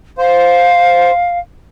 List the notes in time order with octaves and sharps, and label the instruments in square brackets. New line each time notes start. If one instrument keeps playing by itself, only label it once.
[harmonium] C5 [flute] F5